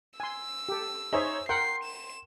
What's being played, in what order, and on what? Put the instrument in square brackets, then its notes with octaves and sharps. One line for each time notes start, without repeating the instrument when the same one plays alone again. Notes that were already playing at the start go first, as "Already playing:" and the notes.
[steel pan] G#5 C6 [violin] E6
[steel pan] G4 A4
[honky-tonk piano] D#4 C5 C#5 [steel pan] G#4 E5
[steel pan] A#4 F#5 G5 [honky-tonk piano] C6 [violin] C7
[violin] E7